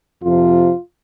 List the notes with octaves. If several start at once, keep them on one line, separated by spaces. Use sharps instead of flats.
F2 C3 F3 F4